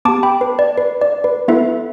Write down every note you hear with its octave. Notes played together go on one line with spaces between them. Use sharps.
B3 G4 A5 D6
G5 B5
B4
D5
B4
D5
B4
B3 E4 A4 B4 E5